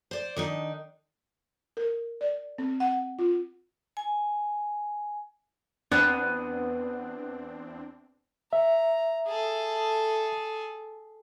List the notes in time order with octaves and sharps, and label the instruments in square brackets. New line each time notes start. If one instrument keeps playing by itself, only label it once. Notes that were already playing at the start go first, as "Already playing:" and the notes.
[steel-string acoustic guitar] C5 D5
D#3 D4 D#4
[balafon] A#4
D5
C4
F#5
F4
[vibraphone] G#5
[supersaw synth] E2 C4 D4 [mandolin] B3
[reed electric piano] E5 [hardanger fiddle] A#5
[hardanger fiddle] G#4 A4